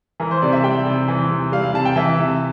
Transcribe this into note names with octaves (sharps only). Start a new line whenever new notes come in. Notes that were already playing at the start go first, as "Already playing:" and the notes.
E3 A#4
C5
C3 D5
E5
G3 G5
C3
E3
C3
G3 F5
F5
C3 A5
G5
E3 E5
C3